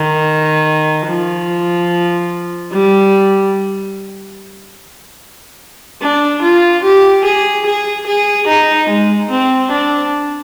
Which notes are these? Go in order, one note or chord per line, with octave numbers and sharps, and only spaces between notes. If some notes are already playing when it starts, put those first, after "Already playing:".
Already playing: D#3
F3
G3
D4
F4
G4
G#4
G#4
G#4
D#4
G#3
C4
D4